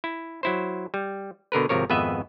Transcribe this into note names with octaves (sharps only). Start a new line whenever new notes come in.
E4
F#3 E4 C5
G3
B2 D3 A#4 B4
G#1 C3 F3 A#4 C#5
G#1 F2 B3 B4 D#5 E5